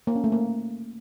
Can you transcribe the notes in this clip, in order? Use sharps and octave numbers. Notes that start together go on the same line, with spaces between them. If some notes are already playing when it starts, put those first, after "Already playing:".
A#3
C#4
A3
A#3